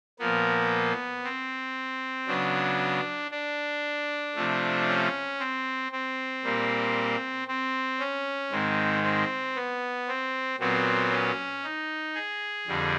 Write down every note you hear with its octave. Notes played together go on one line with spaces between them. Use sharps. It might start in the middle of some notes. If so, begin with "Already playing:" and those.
A#2 F3 A#3 B3
C4
C#3 F#3 B3 D4
D4
C3 F3 A3
C#4
C4
C4
A#2 G3 A#3
C4
C#4
G#2 D#3 G#3 C4
C4
B3
C4
A#2 F#3 B3 C4
C#4
D#4
G#4
F2 D3 G3